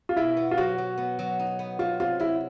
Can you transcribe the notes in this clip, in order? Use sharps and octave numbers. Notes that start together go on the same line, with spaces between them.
F4
B2 E4
B3
F4
F#3 F#4
F#3
B3
F#3
D#4
B3
F#3 F4
C3 F4
F#3 E4